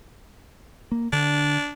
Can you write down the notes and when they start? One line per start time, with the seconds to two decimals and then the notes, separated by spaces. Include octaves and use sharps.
0.92 A#3
1.13 D3 D4